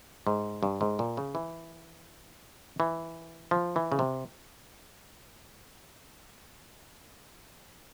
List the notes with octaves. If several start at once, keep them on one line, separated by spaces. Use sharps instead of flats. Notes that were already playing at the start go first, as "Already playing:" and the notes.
G#2
G2
G#2
A#2
C#3
E3
E3
F3
E3
C#3
C3